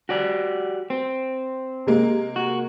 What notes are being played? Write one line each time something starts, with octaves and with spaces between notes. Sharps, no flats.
F#4 G4 D5
C4
C3 G#3 A#3
F#4